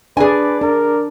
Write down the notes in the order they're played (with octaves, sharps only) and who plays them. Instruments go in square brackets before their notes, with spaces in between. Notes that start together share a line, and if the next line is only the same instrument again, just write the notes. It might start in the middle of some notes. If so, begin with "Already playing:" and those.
[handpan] D4 D5 [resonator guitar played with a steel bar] G#4 G#5 [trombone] B4
[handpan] D4 [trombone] A#4